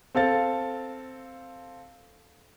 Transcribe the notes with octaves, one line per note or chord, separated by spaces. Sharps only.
C4 A4 F5 A6